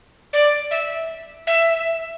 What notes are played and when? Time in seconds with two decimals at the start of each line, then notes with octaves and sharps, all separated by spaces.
0.33 D5
0.71 E5
1.47 E5